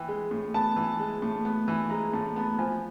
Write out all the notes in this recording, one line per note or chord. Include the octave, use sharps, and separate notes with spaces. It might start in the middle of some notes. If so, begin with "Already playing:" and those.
Already playing: E3 G5
G#3
A2
B3 A5
E3
G#3
A2
B3
E3
G#3 A#5
A2 A5
B3 A5
F3 G#5